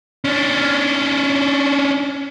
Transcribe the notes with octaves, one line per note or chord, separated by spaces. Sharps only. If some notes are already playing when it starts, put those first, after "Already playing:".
C#4 D4